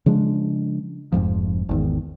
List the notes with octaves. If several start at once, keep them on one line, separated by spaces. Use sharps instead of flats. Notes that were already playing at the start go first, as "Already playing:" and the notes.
C#3 F3 G#3 D4
F1 F2 G#2 F3
G#1 E2 D#3